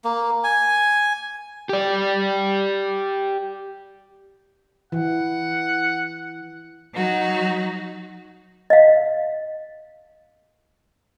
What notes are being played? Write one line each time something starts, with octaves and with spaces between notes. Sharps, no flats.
A#3
G#5
G4 D5
E3 F#5
F#3 D#4 F#4
D#5 F5